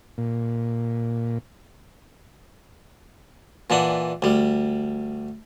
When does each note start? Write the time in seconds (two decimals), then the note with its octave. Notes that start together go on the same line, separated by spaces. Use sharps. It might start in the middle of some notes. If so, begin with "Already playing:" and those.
0.18 A#2
3.70 A#2 E3 D4 F#5
4.22 D2 G3